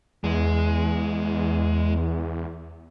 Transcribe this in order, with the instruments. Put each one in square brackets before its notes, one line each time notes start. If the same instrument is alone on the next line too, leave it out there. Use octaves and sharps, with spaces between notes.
[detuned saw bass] E2 [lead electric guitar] G#3